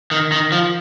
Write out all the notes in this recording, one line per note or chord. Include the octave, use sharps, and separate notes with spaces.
D#3
D#3
F3